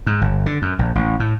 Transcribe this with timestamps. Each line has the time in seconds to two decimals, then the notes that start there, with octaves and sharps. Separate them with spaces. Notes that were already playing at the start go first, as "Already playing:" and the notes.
0.06 G#2
0.21 G1
0.46 D3
0.62 F#2
0.79 A#1
0.95 A1
1.20 A2